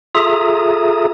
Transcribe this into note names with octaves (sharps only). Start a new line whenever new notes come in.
F4 G#4 A4 E5 A#5 D#6